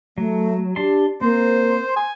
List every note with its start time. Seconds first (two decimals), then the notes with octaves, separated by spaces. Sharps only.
0.18 F#3 A3
0.76 D4 G4 A5 C6
1.21 A#3 C4 C5
1.96 G#5